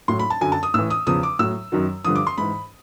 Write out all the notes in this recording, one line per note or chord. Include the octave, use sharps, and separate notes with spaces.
A2 F#3 C6
B5
A5
F#2 D3 F#3 G#5
A5
D#6
A2 E3 E6
D#6
E2 C#3 F3 D#6
D6
A2 F#3 E6
F#2 D#3 F#3
G2 D3 F3 D#6
D6
C6
G#2 E3 B5